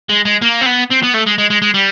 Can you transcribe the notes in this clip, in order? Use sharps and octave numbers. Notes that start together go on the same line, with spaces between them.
G#3
G#3
A#3
C4
B3
C4
B3
A3
G#3
G#3
G#3
G#3
G3